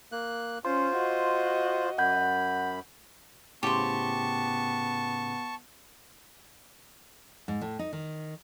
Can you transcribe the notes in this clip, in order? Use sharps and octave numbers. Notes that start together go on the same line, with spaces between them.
A#3 F#6
C#4 F4 C5 C6
F#4 D#5
F#2 F#5 B5 G6
A2 C#3 B3 G4 C5 A5 C#6
G#2
A2
D#4
D#3